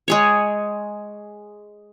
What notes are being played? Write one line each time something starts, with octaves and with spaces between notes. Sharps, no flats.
G#3 G#4 C#5